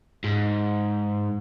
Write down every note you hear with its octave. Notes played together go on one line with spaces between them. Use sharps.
G#2